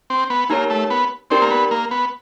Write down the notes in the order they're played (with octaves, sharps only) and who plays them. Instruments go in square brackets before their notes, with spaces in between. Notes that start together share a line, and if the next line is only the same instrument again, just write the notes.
[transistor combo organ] C4
B3
[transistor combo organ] A#3 [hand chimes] D#4 G4 A#4 C#5
[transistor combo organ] A3
B3
[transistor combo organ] C4 [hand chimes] D#4 G4 A#4 D5
[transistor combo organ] A#3
B3
A#3
B3